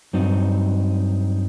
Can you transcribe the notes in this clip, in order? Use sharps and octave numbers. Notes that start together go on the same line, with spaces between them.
G2 F#3 C4 D#4